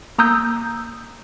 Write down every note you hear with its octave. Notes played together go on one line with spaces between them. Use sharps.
A#3 A#5 D#6 E6 G6